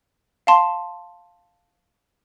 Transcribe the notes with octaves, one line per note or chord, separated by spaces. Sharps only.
F5 A5 C6